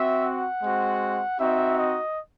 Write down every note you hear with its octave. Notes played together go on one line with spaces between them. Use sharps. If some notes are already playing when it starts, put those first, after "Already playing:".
Already playing: C4 F#4 E5
F#5
G#3 C4 F#4
C4 D#4 F#4 E5
D#5